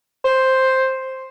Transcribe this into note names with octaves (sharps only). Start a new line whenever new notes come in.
C5